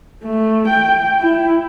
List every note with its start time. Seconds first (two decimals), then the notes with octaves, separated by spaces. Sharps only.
0.24 A3
0.68 G5
1.20 E4